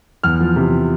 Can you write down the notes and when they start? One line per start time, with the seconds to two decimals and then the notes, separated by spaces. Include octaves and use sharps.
0.24 E2 F6
0.40 F3
0.56 C3